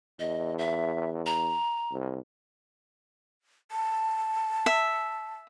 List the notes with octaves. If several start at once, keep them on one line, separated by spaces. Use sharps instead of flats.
E2 D#5
E5
A#5
C2
A5
E5